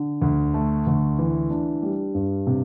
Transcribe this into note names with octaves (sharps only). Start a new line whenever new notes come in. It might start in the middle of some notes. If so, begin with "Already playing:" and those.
Already playing: D3
D2
A3
D2
E3
D4
G3
G2
C3